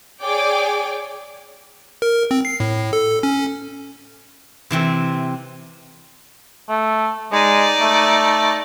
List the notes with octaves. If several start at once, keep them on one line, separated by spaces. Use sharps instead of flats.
G#4 C#5 D5 G5 G#5 D6
A#4
C4
C7
A2
A4
C#4
C3 E3 C4
A3
G#3 D#4 D5
A3